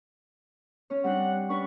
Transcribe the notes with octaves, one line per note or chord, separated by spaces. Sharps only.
C#4 C#5
G3 C4 D4 F#5
C#4 D4 B4 C#6